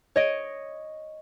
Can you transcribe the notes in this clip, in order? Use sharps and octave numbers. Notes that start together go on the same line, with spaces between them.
C#5 D#5 D7